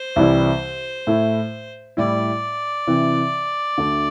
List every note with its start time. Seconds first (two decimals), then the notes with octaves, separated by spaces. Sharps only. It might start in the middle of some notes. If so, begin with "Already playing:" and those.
Already playing: C5
0.16 C2 C3 E3 G3 E4
1.07 A2 A3 E4
1.97 A2 G3 E4 D5
2.87 C3 E3 C4 E4
3.78 D2 D3 A3 D4